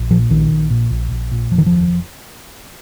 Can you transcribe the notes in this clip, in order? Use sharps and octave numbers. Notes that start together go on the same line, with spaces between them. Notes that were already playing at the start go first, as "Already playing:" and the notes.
Already playing: A#1
A#2 F3
A#1 D#3
A#1
A#2
A#1
A#1
A#2
F1 F3
D#3
F3
D#2